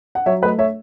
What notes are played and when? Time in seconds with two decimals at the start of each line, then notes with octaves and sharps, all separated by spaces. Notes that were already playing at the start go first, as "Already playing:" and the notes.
0.15 F#5
0.26 F#3 C#5 E5
0.42 A3 B4 D#5
0.58 C#5 E5